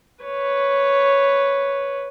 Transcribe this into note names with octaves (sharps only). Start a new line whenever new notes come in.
B4 C#5